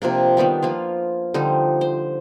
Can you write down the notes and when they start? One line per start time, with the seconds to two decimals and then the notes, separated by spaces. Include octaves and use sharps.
0.02 C3 F3 A#3 D4
0.37 D#3 G3 B3 D4
0.62 F3 A#3 F4
1.34 D3 F3 G3 D#4
1.81 C5